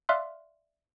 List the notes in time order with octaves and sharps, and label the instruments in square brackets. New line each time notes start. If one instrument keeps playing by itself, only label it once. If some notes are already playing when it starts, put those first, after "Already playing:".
[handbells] D5 E5 F5 C6 F6 F#6